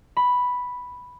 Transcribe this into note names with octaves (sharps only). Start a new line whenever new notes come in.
B5